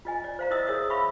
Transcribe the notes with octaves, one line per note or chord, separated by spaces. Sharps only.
F4 D#5 G#5
D5
C5 F5 A#5
E4 C5 D5 D#5 D#6 E6
G#4 A#4 C#5 E5 D#6 E6
E5 F5 B5 C#6 E6